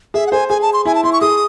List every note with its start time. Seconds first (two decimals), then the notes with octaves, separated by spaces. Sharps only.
0.14 G#4 E5
0.27 F#5
0.32 C5 G#5
0.50 G#4 G#5
0.62 A5
0.73 C6
0.85 E4 G#5
0.95 A5
1.04 E4 C6
1.13 C#6
1.21 G#4 D#6